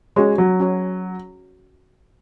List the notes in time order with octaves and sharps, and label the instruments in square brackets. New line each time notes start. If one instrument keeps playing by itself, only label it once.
[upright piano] G#3 [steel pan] C#4 F#4 C#5
[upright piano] F#3
[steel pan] C#4 F#4 C#5